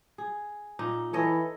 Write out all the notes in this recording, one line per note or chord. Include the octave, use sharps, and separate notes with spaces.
G#4
A#2 D#4
E3 A4 C#5 D#5